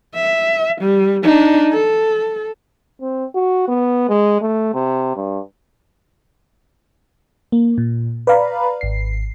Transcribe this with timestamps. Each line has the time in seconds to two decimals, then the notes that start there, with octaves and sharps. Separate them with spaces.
0.15 E5
0.81 G3
1.23 D4 D#4
1.72 A4
3.02 C4
3.35 F#4
3.68 B3
4.09 G#3
4.41 A3
4.74 C3
5.16 G2
7.52 A#3
7.78 A#2
8.27 B4 D5 F5 A#5 B5
8.81 G#1 C7